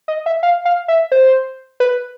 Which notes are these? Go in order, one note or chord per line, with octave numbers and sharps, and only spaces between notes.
D#5
E5
F5
F5
E5
C5
B4